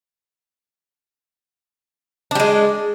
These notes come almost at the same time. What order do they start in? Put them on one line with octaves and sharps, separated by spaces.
D4 G3 G#3